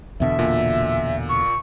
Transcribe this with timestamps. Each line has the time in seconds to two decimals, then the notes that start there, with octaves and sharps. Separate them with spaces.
0.20 E2 B2 D3 E5
0.39 A#2
1.29 C#6